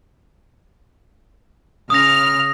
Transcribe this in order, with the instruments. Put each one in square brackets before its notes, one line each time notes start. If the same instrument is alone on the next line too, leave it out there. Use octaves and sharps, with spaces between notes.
[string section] C#3 F6 [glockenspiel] D#6 A#6